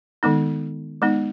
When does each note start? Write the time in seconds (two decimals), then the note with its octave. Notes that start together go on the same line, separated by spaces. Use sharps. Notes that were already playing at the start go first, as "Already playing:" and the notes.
0.23 D#3 G#3 B3 D#4
1.02 G#3 B3 D#4